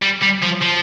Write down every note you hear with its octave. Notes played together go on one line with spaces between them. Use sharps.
G3
G3
F3
F3